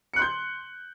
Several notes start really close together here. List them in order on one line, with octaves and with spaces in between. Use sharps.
C#7 F#6 C6 G6